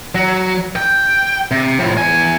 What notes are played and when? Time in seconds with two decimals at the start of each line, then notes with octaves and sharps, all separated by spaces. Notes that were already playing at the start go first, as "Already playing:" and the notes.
0.15 F#3 F#4
0.76 G5
1.51 C3
1.80 A2 F3
1.98 E2 G#5